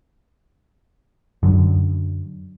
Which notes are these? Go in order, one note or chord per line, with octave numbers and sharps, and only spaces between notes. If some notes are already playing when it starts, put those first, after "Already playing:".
F#2 D3